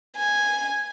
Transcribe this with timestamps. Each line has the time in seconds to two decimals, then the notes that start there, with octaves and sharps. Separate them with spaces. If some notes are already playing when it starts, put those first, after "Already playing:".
0.17 G#5